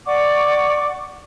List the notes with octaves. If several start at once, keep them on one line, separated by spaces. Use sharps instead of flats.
D5 F#5 C#6 D6